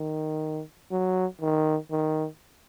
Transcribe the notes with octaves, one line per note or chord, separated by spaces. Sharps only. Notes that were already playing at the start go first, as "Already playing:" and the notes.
Already playing: D#3
F#3
D#3
D#3